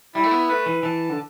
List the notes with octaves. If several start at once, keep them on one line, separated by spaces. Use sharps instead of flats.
G3 E4
A3
B3
A3 B4
E3
E3 A5
D3